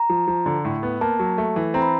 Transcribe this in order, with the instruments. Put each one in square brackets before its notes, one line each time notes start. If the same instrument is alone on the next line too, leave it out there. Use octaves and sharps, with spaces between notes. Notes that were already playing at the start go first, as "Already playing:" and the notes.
Already playing: [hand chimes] A#5
[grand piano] F3
F3
D3
A2
B3
[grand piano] A#3 [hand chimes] A5
[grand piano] F#3
A3
E3
[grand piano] C4 [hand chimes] A#5
[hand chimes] B5